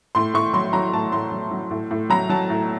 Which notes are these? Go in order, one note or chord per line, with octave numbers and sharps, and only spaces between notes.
A2 C6
A2 C#6
F#3 C6
F#3 A#5
A2 A5
A2 C6
F#3
F#3
A2
A2
F#3 A#5
F#3 A5
A2